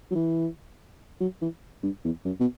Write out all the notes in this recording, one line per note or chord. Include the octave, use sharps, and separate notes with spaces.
F#3
E3
F#3
E3
G2
E2
F#2
B2